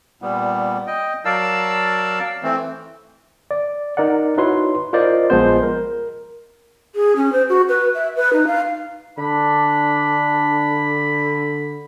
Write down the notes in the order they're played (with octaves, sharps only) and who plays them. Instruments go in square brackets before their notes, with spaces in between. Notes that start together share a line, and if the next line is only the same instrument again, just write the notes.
[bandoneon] A#2 G3 B3
D#5 G5
F#3 A#4 D5 F5 A5 E6
E3 A3 C4
[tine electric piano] D5
D#4 A#4 D5 F#5
D#4 E4 F#4 B4 C#5 C6
F4 A#4 C5 D5 D#5
A#1 F3 G#3 B3 C5
A#4
[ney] G#4
C#4
C5
F#4
B4
E5
B4
D#4
F5
[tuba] D3 [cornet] D4 [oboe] B5